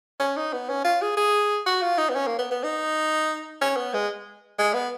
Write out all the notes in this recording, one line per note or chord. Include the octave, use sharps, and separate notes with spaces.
C#4
D#4
B3
C#4
F4
G#4
G#4
F#4
F4
D#4
B3
C#4
A#3
B3
B3
D#4
C#4
B3
G#3
G#3
B3